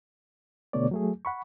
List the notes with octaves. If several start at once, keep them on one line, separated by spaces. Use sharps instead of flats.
B2 D3 A3 B3 C#5 D5
F#3 A3 G#4
F#5 B5 C#6